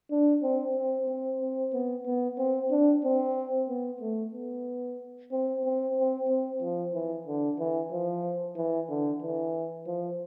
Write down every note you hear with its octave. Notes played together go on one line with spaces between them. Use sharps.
D4
C4
C4
C4
C4
B3
B3
C4
D4
C4
B3
A3
B3
C4
C4
C4
C4
F3
E3
D3
E3
F3
E3
D3
E3
F3